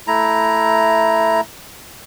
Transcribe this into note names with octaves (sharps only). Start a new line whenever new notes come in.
A3 E4 A#5